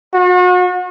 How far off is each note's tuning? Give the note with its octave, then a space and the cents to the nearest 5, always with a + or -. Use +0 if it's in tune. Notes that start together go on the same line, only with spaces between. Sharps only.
F#4 -40